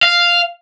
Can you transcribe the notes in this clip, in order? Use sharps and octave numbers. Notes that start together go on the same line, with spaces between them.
F5